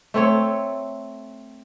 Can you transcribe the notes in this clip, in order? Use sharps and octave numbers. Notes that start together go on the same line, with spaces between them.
A3 C4 A4 C#5